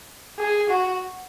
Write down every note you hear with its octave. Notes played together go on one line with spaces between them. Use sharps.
G#4
F#4